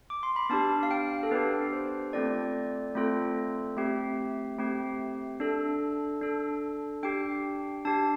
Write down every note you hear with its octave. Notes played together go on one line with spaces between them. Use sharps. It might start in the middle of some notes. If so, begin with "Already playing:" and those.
D6
C6
B5
B3 D4 G4 A5
F5
G5
A4
B3 D4 G4 B4
C5
A3 C4 F4 A4 D5
A3 C4 F4 A4
A3 C4 G4 E5
A3 C4 G4
D4 A4
D4 A4
D4 G4 G5
D4 G4 A5